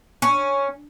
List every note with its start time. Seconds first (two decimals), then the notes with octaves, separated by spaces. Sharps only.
0.22 C#4